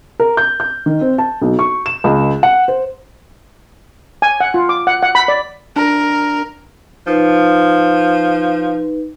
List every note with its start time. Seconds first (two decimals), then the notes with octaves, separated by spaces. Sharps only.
0.20 A#4
0.37 G6
0.60 G6
0.86 D#3
1.01 C4
1.18 A5
1.41 B1
1.59 C#6
1.86 E7
2.04 C#2
2.43 F#5
2.68 C5
4.22 G#5
4.40 F#5
4.54 F4
4.69 D6
4.87 F#5
5.03 F#5
5.15 B5
5.28 D5
5.76 D4 A#4
7.07 F3 D#4 B4